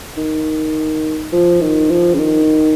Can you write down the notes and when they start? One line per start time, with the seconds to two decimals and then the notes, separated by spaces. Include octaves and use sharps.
0.17 D#3
1.32 F3
1.61 D#3
1.90 F3
2.14 C#3
2.18 D#3